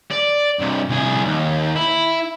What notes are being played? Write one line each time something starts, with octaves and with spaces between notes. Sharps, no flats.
D5
G2 C3
C2 G#4
D#2
E4